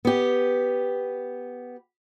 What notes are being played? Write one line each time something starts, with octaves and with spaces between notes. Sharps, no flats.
B3 G4